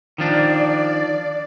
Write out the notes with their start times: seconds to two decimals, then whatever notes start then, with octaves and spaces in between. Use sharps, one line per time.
0.18 D#3 F3 D4 D5